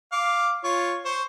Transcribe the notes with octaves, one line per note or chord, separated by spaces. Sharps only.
F5 D6
F4 C#5
C5 C#6